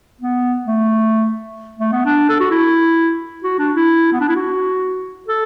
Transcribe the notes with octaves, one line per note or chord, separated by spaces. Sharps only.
B3
A3
A3
B3
D4
A4
F#4
E4
F#4
D4
E4
B3
D4
E4
F#4
A4